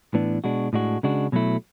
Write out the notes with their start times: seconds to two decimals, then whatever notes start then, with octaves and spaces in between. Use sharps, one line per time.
0.14 A2 E3 B3 D4
0.44 B2 G#3 D4 F#4
0.73 A2 G#3 D4 F#4
1.03 C#3 G#3 D4 F#4
1.32 B2 F#3 A3 E4